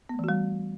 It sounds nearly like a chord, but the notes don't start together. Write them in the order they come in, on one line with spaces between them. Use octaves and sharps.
B3 A3 E3 F#4 G3